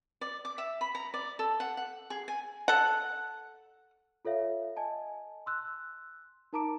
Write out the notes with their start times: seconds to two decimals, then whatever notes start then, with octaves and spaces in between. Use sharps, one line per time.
0.21 D5
0.45 D6
0.58 E5
0.81 B5
0.95 A#5
1.14 D5
1.39 A4
1.60 F#5
1.77 F#5
2.10 G#4
2.28 G#5
2.68 A4 F#5
4.25 F4 A4 C#5 E5 F5
4.77 D#5 G#5 A5
5.46 C6 E6 F#6
6.53 D#4 A#4 A5 A#5 D6 D7